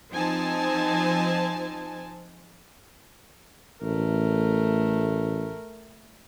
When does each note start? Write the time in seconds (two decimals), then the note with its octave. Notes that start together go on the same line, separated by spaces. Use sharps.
0.10 F3 C4 D#4 C5 G#5 A5
3.82 A1 A3 A#4